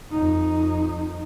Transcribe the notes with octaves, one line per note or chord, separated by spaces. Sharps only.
F2 D#4